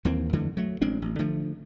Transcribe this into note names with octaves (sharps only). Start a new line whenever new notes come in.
D#2 E3 A#3 C4
F2 D3 E3 A3
F#3 A3
A1 G#3 C4 D4
A1
D3 F3 A3